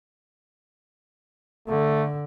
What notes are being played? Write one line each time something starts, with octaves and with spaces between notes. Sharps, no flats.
D3 A3